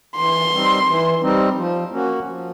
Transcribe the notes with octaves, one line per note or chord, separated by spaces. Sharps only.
E3 C6
G3 C4 D#4
E3
G3 C4 D#4
F3
A#3 C#4 F#4
F3